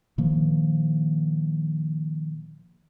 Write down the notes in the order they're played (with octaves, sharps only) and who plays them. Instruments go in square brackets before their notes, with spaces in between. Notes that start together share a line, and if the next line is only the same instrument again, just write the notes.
[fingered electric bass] A#2 D#3 F3 A#3